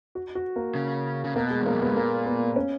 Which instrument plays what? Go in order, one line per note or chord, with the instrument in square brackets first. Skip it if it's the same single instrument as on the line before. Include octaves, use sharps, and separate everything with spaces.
[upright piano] F#4
F#4
A#3
[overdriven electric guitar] C#3
C#3
[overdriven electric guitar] B2 [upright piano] A#3
[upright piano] G#3
[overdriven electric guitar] E2
[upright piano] A#3
[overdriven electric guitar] F#2
[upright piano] B3
[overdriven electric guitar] G#2
[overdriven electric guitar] A#2 [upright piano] A#3
[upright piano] B3
C#4